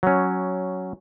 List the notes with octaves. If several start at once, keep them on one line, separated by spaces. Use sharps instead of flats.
F#3 C#4